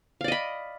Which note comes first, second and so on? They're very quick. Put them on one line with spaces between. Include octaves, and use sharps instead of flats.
F5 D5 D#5 B5